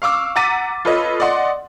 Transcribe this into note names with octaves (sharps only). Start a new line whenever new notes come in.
F5 C#6 D6 E6
F#5 A#5 D6 A6 B6 D#7
F4 A4 B4 C#5 D#5
D5 D#5 F#5 C6